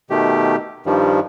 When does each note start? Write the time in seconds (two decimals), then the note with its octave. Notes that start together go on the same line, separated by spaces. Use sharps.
0.10 B2 D#3 A3 G4
0.86 G2 D#3 F3 G3